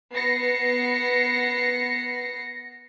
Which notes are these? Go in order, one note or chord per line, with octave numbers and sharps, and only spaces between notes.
B3 A#6 C7 C#7